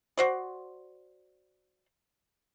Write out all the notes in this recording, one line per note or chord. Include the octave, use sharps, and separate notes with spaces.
F#4 C5 D5